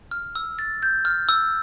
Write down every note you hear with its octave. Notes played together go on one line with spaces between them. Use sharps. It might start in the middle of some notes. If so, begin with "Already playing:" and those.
F6
E6
A6
G6
F6
E6